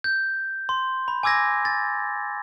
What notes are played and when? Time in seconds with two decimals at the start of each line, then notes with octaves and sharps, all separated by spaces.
0.04 G6
0.69 C6
1.08 B5
1.23 G#5 D6 E6 G#6 A#6
1.65 A6